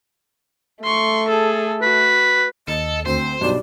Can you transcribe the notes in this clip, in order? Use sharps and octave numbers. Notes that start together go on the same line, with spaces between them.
A3 C6 C#6
G#4 A4
F#4 B4
D#2 A4 D#5
D2 C4 C5
B1 G2 B2 D5